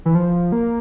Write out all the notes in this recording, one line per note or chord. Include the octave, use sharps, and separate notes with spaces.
E3
F3
A#3